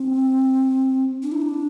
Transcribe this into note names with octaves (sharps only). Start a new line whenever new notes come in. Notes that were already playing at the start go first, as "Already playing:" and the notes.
Already playing: C4
D4
E4
D4